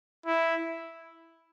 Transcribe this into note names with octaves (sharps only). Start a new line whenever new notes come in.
E4